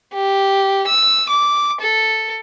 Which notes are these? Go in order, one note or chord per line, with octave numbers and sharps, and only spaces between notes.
G4
E6
D6
A4